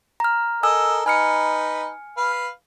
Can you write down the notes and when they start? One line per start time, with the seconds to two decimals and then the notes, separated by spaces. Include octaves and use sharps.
0.20 A#5 F6
0.63 A4 A#4 D#5 G#5 E6
1.06 D#4 B4 G#5 F6 C#7
2.17 B4 F5